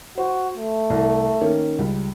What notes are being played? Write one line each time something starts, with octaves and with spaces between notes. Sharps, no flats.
F#4 C5
A3
C2
D#3 A#3 C#4
C#2 G3